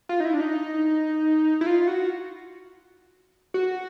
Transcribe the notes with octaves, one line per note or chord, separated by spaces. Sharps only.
F4
D#4
E4
D4
D#4
E4
F4
F#4
F#4